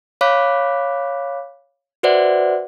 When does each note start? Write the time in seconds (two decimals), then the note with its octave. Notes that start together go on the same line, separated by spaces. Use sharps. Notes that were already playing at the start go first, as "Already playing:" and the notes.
0.21 C#5 F5 B5 D6 F#6 B6
2.03 F#4 B4 C5 D5 E5 F#5